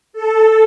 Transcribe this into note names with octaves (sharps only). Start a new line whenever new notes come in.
A4